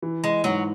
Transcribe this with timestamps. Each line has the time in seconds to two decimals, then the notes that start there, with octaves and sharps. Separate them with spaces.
0.02 E3
0.24 G#3
0.44 G#2 F#3